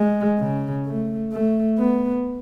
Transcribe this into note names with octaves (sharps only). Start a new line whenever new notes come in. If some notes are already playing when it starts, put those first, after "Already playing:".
Already playing: G#3
C#3
A3
A3
B3